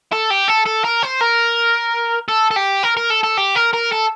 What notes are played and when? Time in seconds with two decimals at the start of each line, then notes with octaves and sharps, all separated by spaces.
0.12 A4
0.30 G4
0.48 A4
0.66 A4
0.85 A#4
1.03 C5
1.21 A#4
2.28 A4
2.51 A4
2.56 G4
2.83 A#4
2.97 A#4
3.10 A4
3.23 A4
3.37 G4
3.55 A#4
3.73 A#4
3.92 A4